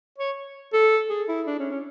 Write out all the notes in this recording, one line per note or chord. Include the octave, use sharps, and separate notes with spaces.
C#5
A4
G#4
E4
D4
C#4
C#4